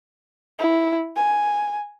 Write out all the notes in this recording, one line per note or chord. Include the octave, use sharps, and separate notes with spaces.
E4
G#5